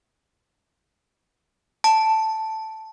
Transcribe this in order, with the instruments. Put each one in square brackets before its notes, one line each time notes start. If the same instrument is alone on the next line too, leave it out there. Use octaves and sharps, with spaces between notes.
[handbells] A5